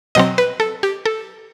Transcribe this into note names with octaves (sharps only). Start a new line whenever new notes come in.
B2 F#3 C4 D#5
B4
A4
G4
A4